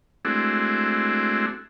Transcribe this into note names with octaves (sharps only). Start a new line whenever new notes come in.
G#3 A3 C4 D4 E4 F#4